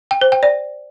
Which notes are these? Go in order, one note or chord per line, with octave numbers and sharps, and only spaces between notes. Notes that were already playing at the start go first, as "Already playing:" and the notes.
G5
C5
G5
D5